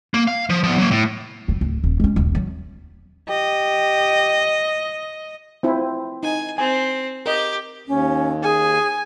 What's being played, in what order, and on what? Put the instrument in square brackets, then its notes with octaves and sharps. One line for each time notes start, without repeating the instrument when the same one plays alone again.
[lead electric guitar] A#3
F5
F3
F3 B3
F#3 A#3
A2
[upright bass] E1 F#3
D1
D#1
G#3 C#4
D#1 B1
F#3
[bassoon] G4 [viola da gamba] D#5
[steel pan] C4 E4 F4
[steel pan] D#4 [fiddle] G#5
[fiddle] C4 [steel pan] G#5
[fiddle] G4 [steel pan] A#4 D#5
[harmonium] D#2 [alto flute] C#4
[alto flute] G#4 [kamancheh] G#5